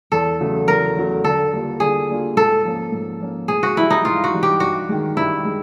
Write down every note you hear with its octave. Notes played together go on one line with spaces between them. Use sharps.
E2 A4
C#3 F#3 A3
E2 A#4
C#3 F#3 A3
D3 A4
G3 A#3 D4 F4
D3 G#4
G3 A#3 D4 F4
G#2 A4
F3 A#3 C#4
G#2
F3 A#3 C#4
G#2 G#4
F#4
E3 G3 E4
D#4
G#2 F4
F#4
E3 G3
G4
G2 F#4
D#3 G#3
G2 E4
G#3